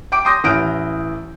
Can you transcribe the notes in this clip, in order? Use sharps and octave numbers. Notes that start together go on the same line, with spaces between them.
G5 D6 D7
C6 D6 D#6 G6 A#6
A1 E3 D#6 F6 G6 D7